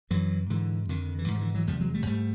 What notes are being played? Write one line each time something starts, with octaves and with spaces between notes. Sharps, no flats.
F#2 D3 E3 F#3
G#2 D3 E3
F2 D3 D#3
E3
G#2 D#3
F3
D3 E3
E3 F#3
E2 C3 F3 G3
F#3 G#3
G3 A3
G#2 G3 A3